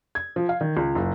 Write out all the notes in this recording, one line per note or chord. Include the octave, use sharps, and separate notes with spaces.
G#6
F3
F5
D#3
C#2
F#1